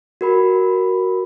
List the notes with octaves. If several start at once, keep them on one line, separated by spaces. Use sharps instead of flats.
F#4 A#4 B5